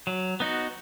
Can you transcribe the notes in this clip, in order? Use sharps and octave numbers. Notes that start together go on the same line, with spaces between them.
F#3
B3 D#4 F#4